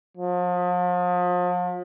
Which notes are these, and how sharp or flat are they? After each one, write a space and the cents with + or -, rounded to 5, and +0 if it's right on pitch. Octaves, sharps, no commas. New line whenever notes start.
F3 +40